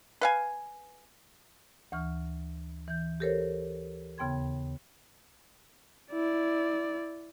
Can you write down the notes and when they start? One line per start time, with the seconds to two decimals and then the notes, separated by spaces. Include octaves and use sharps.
0.21 B4 F5 G#5
1.92 D2 E3 C#6 F6
2.88 E3 G6
3.20 G4 A4 A#4 C5 C#5
4.18 D#2 C#3 B3 G5 C6 G#6
6.12 E4 D5